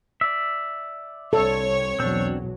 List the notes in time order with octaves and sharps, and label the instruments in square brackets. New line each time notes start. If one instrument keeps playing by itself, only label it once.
[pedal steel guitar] D5 E5
[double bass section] C2 C4 [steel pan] A4 [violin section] C#5
[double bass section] B1 E2 F#3 [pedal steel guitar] C4 D4